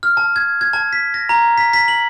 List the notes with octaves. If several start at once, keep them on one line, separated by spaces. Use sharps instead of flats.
F6
A5
G#6
G#6
A5
B6
A#6
A#5
B6
B6
F#7